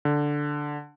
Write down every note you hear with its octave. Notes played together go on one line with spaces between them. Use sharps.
D3